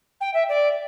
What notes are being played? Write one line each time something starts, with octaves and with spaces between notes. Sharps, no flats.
G5
E5
D5